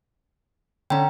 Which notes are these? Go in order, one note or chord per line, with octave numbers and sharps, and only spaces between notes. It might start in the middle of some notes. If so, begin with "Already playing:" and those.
D3 C#4 G5 A#5